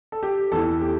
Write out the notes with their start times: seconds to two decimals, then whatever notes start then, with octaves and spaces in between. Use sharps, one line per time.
0.12 A4
0.23 G4
0.52 E2 A4
0.56 E3
0.81 G4